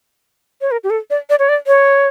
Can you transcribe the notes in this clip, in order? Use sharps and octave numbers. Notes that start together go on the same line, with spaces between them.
C#5
A#4
G4
A4
D5
D5
C#5
D5
C#5